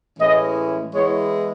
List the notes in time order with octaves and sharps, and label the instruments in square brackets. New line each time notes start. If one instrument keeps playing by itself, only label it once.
[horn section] A2 E3 G#3 C#4 D#5
E3 G#3 B3 E4 C#5